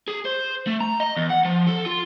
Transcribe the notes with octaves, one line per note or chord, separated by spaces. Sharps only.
G#4
C5
A3
A#5
D#5
E2
F#5
F3
A4
F4